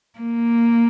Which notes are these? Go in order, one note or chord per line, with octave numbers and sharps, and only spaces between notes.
A#3